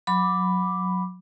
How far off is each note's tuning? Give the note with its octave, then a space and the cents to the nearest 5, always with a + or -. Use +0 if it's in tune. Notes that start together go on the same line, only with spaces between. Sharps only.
F#3 -20 B5 +0 D6 +0